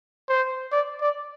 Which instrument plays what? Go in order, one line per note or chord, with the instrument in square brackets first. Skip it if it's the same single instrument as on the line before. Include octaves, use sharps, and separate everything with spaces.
[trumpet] C5
D5
D5